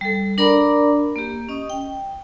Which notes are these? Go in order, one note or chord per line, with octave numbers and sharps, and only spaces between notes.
G3 A4
D4 A#4 D5 A#5 B5 D6
A#3 G4
C#4 D#5 D#6
G5